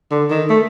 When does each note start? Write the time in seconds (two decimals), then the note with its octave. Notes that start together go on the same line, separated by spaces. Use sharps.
0.11 D3
0.30 D#3
0.50 A3